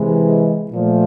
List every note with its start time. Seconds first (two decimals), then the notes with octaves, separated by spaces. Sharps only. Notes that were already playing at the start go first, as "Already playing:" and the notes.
Already playing: C3 E3 G#3
0.72 A#2 F3 A3